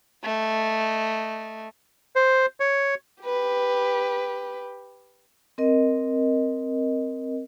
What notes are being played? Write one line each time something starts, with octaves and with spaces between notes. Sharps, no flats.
A3 D#5
C5
C#5
G4 B4
C4 A#4 D#5